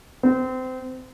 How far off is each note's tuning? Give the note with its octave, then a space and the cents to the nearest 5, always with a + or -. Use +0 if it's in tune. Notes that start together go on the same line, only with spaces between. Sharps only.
C4 -25